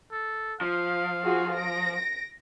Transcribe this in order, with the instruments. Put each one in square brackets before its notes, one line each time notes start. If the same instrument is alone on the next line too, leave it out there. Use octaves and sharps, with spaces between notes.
[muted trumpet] A4
[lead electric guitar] F3 [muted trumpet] F5
[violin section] F4 F#4 G#4
A#6 D7